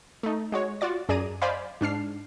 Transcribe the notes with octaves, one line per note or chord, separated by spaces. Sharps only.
A3 D#4
G#3 F#4 C#5
F4 F#4 D5 A6
F#2 G#4 D5 A#5 D#7
C5 D5 D#5 F5 G#5 B5
G#2 D4 F6 C7